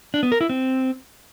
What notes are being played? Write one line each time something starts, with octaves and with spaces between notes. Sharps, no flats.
D4
B3
A#4
E4
C4